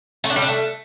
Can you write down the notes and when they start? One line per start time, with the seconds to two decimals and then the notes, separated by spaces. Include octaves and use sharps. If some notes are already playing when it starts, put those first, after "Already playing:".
0.24 A3
0.30 D4
0.36 G3
0.42 D4
0.48 A3